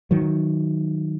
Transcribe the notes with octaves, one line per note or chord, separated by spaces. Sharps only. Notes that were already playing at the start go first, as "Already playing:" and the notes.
D#3 F#3